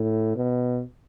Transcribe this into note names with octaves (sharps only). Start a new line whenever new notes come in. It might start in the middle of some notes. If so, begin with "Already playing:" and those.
Already playing: A2
B2